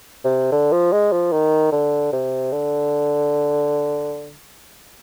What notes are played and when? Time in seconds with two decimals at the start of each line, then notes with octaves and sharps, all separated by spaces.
0.25 C3
0.52 D3
0.72 F3
0.92 G#3
1.12 F3
1.32 D#3
1.72 D3
2.13 C3
2.52 D3